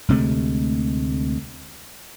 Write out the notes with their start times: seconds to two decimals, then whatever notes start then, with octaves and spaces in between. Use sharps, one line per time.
0.08 D2 C3 G#3 A3